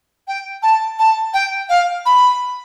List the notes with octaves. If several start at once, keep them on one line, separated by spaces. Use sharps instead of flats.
G5
A5
A5
G5
F5
B5